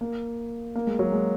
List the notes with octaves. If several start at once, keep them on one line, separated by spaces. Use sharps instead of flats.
A#3
A#3
G#3
F#3
G#3